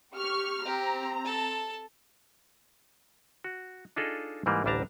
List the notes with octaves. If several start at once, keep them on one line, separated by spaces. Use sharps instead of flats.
G4 C#6 F6
C4 G4 A#5
A4 A5
F#4
D4 D#4 F4 G#4 A4 D#5
G#2 E3 G3 A#3
A1 D2 G3 D4 A5 A#5